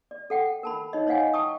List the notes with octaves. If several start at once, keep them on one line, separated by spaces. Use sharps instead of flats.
D5
A4 F#5 G5
A#4 A5 B5
D#4 C#5 D#5
C5 C#5 D#5 F5 F#5 G#5
G5 A5 C#6 D#6